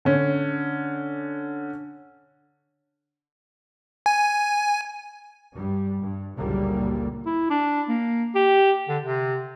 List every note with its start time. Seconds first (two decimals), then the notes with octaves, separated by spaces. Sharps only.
0.05 D3 C#4
4.06 G#5
5.53 G2 G3
6.01 G2
6.36 F#1 C#2 A#2 D3 G3 A#3
7.26 E4
7.50 D4
7.89 A#3
8.35 G4
8.89 D3
9.03 C3